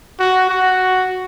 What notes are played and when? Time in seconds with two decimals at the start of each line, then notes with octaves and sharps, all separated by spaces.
0.19 F#4
0.49 F#4